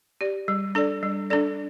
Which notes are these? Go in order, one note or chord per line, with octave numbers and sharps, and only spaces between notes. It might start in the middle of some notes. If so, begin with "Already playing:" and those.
G4 D5
G3
D4 A4 D5
G3
D4 A4 D5